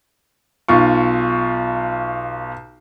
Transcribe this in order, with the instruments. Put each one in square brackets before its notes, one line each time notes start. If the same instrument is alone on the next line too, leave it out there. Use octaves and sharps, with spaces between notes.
[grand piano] B1 F4 C#6